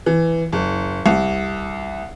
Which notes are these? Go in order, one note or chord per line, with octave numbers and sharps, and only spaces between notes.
E3
F#1
C2